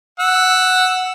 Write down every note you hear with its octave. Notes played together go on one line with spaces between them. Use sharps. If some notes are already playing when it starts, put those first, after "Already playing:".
F#5 E6